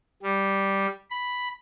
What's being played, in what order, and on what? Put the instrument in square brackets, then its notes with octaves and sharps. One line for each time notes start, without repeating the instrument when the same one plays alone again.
[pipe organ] G3
B5